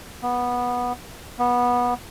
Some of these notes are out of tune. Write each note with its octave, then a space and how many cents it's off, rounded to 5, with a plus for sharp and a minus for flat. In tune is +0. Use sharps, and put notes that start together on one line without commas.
B3 -15
B3 -20